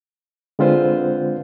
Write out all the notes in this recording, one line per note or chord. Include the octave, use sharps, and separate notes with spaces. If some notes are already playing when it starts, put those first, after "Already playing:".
D3 G#3 C4 F4 B4 C5